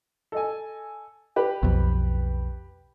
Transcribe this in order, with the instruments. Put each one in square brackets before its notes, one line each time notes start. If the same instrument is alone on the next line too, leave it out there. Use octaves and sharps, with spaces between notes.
[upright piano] A4 D#5 G#5
G4 B4
[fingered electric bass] B1 F2